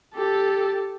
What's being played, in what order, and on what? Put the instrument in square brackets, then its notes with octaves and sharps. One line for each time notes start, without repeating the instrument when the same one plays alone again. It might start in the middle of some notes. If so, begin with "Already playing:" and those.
[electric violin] G4 A4